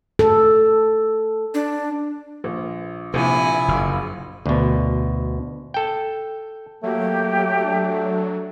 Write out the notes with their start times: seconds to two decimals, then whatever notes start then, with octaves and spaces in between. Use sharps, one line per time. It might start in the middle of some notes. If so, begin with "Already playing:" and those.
0.19 A4
1.54 D4
2.44 A#1
3.14 A#1 C3 E4 G#5
3.68 F#1
4.46 D2 B2
5.74 A4 G5
6.83 F#3 A3 A#3 G4
7.61 D4